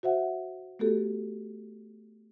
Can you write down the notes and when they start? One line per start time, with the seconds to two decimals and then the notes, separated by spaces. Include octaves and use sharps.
0.03 F#4 C5 E5 F#5
0.79 A3 B3 F#4 G4 A4